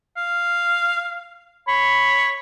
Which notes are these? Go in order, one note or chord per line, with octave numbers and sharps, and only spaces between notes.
F5
C#5 B5